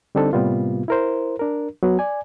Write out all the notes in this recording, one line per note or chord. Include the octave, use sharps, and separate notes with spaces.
D3 G3 C4 D4 D#4 A4
A2 C3 G3 A#3 B3 F4
E4 A#4 C5
D4 A#4
F#3 B3 F#4
D5 G#5